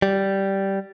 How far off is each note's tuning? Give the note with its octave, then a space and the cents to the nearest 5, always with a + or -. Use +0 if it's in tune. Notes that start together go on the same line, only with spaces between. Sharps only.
G3 -10